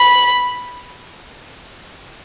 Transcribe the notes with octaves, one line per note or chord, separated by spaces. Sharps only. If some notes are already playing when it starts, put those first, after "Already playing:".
Already playing: B5